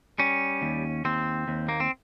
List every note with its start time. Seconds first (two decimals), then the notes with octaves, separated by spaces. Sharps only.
0.19 G3 C#4
0.62 D#2
1.05 D#2 C4
1.48 D#2
1.69 A#3
1.80 C4